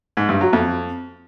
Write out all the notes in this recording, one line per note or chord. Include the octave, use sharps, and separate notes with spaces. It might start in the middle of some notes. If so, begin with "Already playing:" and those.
G#2
G2
F#3
F2